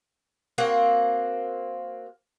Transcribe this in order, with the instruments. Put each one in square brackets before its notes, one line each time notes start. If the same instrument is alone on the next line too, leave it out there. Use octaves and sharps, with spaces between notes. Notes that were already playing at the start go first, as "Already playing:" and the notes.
[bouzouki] A#3 C4 F#4 F#5